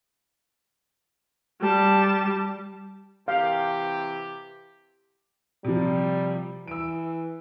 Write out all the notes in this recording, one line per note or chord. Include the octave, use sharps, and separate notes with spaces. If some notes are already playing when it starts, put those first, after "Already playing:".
G3 A5
C3 E3 G4 F5
C3 F3 G3
E3 E6 D7